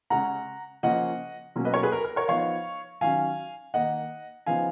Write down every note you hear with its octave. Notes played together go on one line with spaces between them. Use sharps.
C#3 G#3 C#4 F#5 A#5
C#3 F3 A#3 C#4 D#5 F#5
B2 F#3 A#3 C#4
B4 D#5
A#4 C#5
G#4 B4
A#4
A#4
A#4 C#5
F3 B3 D#4 C#5 F5
D#3 F#3 C#4 F5 G#5
D#3 A#3 D#4 D#5 F#5
C#3 F3 B3 D#4 F5 G#5